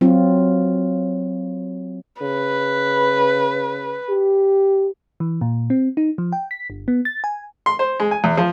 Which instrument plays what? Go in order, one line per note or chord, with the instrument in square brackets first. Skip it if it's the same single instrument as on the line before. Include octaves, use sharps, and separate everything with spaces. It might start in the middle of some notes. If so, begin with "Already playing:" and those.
[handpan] F#3 C4 F4
[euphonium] C#3 [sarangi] B4
[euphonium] G4
[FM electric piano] E3
A#2
C4
D#4
F3
G5
B6
G1
B3
A6
G#5
[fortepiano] C6
C5
G#3
G#5
E2
F3